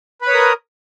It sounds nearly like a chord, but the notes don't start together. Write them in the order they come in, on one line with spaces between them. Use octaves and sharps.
B4 B5 C#5 D#6 A#4